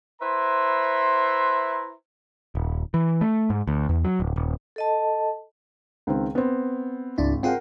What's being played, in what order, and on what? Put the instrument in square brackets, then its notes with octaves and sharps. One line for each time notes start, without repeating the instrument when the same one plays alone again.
[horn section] E4 B4 C5 E5 A#5 C6
[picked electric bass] D#1
E3
A3
G#2
D2
E2
F#3
D1
D#1
[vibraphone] A4 D#5 A5
[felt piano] C#2 D#3 C4
B3 C4
[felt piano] G#1 [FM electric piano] C#2 D4 E4
[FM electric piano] C4 F4 G#4 [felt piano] A#4 F#5 G5